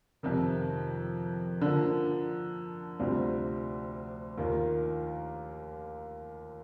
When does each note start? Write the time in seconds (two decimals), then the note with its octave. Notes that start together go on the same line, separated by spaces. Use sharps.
0.23 F2 C3 D#3
1.61 D3 F3 A#3
2.99 D2 C3 G3 C4 F4
4.38 D#2 D#3 A#3 F4